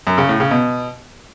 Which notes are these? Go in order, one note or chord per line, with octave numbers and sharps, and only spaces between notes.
F#2
C#3
A2
C#3
B2